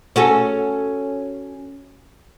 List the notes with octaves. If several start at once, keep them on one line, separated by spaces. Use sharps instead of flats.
C#4 F#4 A4